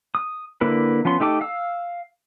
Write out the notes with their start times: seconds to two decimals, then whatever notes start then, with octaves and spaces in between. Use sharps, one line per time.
0.15 D#6
0.61 D3 A#3 E4 B4
1.05 F3 B3 C#4 C6
1.20 A3 D#4 G4 A4 D6
1.41 F5 E6